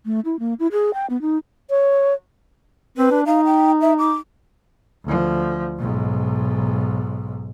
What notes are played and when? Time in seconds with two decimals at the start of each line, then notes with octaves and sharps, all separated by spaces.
0.05 A3
0.25 E4
0.39 A#3
0.60 E4
0.72 G#4
0.94 G5
1.10 B3
1.21 D#4
1.70 C#5
2.98 C4 B4
3.11 D4
3.26 D#4 F5
3.45 G5
3.81 E5
3.99 D6
5.04 D2 F3
5.78 B1 G#2